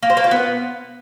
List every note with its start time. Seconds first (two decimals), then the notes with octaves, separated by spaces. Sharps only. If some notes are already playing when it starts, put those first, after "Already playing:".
0.03 A#3
0.10 C5
0.17 A#3
0.24 F4
0.31 B3